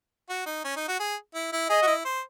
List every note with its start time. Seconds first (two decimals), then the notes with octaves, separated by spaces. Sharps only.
0.29 F#4
0.46 D#4
0.65 C#4
0.76 D#4
0.88 F#4
1.00 G#4
1.34 E4
1.52 E4
1.69 G#4 D#5
1.82 F#4
1.87 E4
2.05 C5